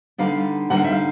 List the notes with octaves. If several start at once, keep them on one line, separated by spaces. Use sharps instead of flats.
D3 G3 B3 D#4 F5
D3 G3 B3 D#4 F#5
F5
E5
F5